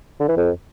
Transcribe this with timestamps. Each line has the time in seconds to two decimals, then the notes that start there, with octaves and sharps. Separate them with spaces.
0.20 D3
0.28 E3
0.37 F2